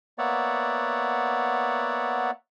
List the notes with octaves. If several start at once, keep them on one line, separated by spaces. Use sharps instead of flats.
A#3 B3 C#5 D5 E5 F#5